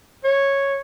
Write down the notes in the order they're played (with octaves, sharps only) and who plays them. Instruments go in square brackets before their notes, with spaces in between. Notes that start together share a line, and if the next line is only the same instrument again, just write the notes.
[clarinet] C#5